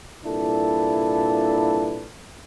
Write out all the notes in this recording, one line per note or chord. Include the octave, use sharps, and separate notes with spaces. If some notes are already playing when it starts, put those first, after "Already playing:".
C2 A#2 D4 E4 A4 B4